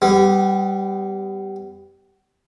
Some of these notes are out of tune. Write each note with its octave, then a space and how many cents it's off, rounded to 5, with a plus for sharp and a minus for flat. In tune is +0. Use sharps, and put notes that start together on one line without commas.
G3 -5 B3 +25